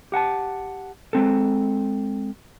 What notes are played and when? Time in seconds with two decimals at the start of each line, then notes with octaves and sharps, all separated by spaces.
0.12 G4 F#5 G#5 A5
1.13 G#3 C4 A4